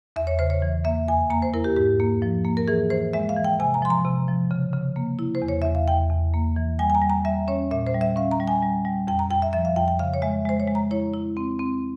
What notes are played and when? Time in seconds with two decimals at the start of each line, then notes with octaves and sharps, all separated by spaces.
0.16 E2 E5
0.27 C#5
0.39 C#3 C5
0.50 C#5
0.62 E3
0.84 A#3 E5
1.08 F2 G#5
1.30 A#3 A#5
1.42 C5
1.54 E4 A#4
1.64 G4
1.76 G#2 G4
2.00 A#3
2.22 F3
2.45 A#3
2.57 A#4
2.68 E3 G#4
2.90 E3 C5
3.13 G#3 E5
3.29 F5
3.37 E3
3.44 G5
3.60 C3 G#5
3.74 A#5
3.82 F3 C6
3.90 A#5
4.05 C3
4.28 F3
4.51 C#3
4.73 C#3
4.96 A#3
5.19 E4
5.35 C5
5.42 E2
5.48 C#5
5.62 E2 E5
5.75 F5
5.88 E2 G5
6.10 E2
6.34 A#3
6.56 E3
6.79 G3 G#5
6.90 G#5
6.95 A#5
7.02 G3
7.10 A#5
7.25 G3 E5
7.48 C#4 C#5
7.71 A#2 E5
7.87 C5
7.94 G3
8.01 E5
8.16 C#4 F5
8.31 A#5
8.40 G3
8.48 G#5
8.62 G3
8.85 G3
9.07 F2 G5
9.19 A#5
9.30 F2 G5
9.42 E5
9.53 F3 E5
9.65 F5
9.76 F2 G5
9.88 G5
9.99 C#3 F5
10.14 C#5
10.22 G#3 E5
10.45 G#3 C5
10.60 C#5
10.68 G#3
10.75 A#5
10.91 E4 C#5
11.14 E4
11.37 C4
11.59 C4